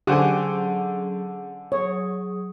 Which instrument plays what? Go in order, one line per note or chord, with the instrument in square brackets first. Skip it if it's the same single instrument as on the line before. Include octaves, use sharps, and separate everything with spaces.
[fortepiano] D3 C5 G#5 [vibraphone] F#3 C#4 G#4 [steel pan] G4 F#5
[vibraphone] F#3 G#4 D#6 [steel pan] C#5